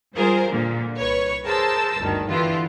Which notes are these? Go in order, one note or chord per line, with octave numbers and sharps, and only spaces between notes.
G3 F4 G#4 A#4 C5
A#2 D3 A#3
C2 B4 C#5 C#6
G#4 A#4 C5 A5 E6
G1 D2 D#3
D3 E3 B3 E4 F4 G4